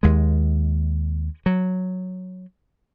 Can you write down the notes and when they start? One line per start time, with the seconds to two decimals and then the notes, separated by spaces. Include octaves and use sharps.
0.03 D#2 G#3
1.46 F#3